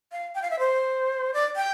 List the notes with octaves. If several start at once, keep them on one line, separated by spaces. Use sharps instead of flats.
F5
G5
F5
E5
C5
D5
G5